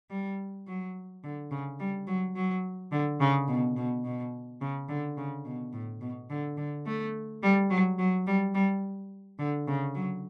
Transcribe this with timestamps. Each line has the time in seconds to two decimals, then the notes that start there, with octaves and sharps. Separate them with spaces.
0.10 G3
0.67 F#3
1.24 D3
1.51 C#3
1.80 G3
2.07 F#3
2.36 F#3
2.92 D3
3.20 C#3
3.48 B2
3.76 B2
4.05 B2
4.61 C#3
4.89 D3
5.17 C#3
5.45 B2
5.73 A2
6.01 B2
6.30 D3
6.57 D3
6.86 A3
7.42 G3
7.70 F#3
7.99 F#3
8.27 G3
8.55 G3
9.39 D3
9.67 C#3
9.95 F#3